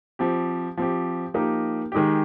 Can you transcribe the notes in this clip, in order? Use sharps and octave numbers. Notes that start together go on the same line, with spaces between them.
F3 C4 G4
F3 C4 G4
F3 A#3 D#4 G4
D#3 G#3 D#4 G4